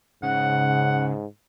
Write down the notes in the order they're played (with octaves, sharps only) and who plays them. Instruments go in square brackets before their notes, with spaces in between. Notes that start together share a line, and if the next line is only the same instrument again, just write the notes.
[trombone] G#2 [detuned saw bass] C#3 [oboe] F#5